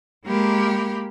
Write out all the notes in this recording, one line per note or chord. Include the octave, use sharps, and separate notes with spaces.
G#3 A#3 G4 A#4 B5